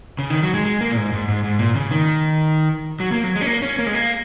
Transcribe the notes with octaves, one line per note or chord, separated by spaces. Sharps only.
C#3
D#3
F#3
G#3
G#3
A#3
A#2
G#2
G#2
G#2
G#2
A#2
C#3
D#3
F#3
A#3
F#3
G#3
C#4
A#3
C#4
A#3
G#3
A#3